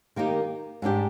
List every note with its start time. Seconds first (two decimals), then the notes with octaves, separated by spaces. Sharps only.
0.16 D#3 A#3 D#4 G4
0.82 G#2 G3 D4 G4